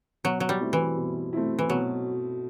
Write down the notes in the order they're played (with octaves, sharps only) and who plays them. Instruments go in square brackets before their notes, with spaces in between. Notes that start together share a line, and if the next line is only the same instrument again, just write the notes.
[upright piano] B2 [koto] F#3
[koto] F#3
G3
[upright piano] A3 C4 E4
[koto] E3
[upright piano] B2
A3 C4 E4
[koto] E3
[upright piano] B2 [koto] F#3